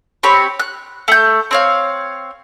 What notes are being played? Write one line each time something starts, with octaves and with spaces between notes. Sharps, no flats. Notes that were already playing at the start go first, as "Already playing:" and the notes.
C4 G4 C#5 B5
F#6
A3 G6
C4 C#5 F5